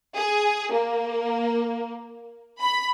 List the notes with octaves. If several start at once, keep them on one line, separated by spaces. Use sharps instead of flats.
G#4
A#3
B5